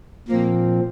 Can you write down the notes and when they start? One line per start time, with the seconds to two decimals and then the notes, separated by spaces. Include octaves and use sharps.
0.28 A#2 F3 A#3 C4